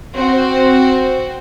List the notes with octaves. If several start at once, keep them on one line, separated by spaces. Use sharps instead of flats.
C4 F#4 C5